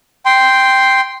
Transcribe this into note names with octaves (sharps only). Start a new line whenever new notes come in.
G5 C6